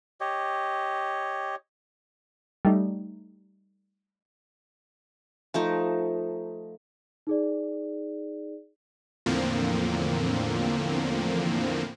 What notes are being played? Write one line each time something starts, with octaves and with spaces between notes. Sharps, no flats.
G4 C#5 D#5
G3 A3 D#4
F3 A3 D#4
D#4 G#4 D5
E2 A2 D3 F3 A#3 C4